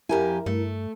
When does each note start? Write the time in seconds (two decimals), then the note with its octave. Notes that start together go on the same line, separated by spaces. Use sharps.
0.09 F2 E4 G4 A#4 G#5
0.46 G2 A3